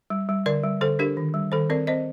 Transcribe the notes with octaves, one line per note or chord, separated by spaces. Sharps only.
G3
G3
D3 A#4 D5
G3
D3 A4 C5
D4 G4 A#4
D#3
G3
D#3 A4 C5
C4 A#4 D5
C4 C5 D#5